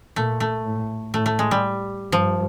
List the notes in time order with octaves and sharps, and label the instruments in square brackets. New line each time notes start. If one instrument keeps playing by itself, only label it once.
[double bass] A#2 [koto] A3
[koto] A3
[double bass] A2
[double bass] A2 [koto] A3
[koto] A3
G#3
G3
[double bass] G2 [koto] F3